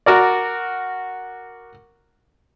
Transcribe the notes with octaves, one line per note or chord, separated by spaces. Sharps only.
F#4 A#4 D5